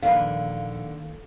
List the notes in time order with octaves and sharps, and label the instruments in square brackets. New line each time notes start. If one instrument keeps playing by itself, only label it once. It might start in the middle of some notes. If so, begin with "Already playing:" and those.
[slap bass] D#1 A#1 E2 [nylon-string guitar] D3 [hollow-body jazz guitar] D#3 A#3 B4 [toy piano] F5